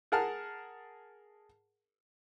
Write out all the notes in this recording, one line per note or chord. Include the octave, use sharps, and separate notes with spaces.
G#4 A#4 F#5 A5 F6